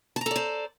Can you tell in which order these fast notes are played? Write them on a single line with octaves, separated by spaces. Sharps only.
A5 A#5 A4 D5 C5